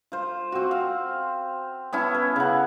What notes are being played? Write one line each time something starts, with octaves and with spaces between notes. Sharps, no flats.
F4 C5
C4 F#4
F5
B3 C#4 E4 A5
B4
C#3 F#5